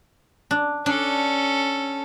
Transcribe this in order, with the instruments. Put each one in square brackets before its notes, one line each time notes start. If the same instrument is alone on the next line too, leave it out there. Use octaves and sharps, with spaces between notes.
[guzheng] D4
[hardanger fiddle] C#4 A4 [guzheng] D4